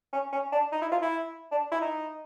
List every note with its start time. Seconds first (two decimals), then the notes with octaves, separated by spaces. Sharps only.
0.13 C#4
0.33 C#4
0.52 D4
0.72 D#4
0.82 E4
0.92 F4
1.02 E4
1.52 D4
1.71 E4
1.81 D#4